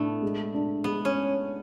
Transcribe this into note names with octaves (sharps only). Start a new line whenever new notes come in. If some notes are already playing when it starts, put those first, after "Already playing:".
Already playing: A2 A3 B3 D4
G#3
D4
G#3 B3
C#4